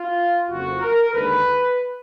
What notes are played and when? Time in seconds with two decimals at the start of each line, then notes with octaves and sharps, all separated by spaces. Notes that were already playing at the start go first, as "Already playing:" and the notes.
Already playing: F4
0.49 F#1 F2 F3 F#4
0.81 A#4
1.13 D#2 D3 G#3 B4